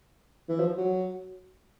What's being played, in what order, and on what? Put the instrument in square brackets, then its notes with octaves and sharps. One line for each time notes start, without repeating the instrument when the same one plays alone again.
[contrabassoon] E3
F3
F#3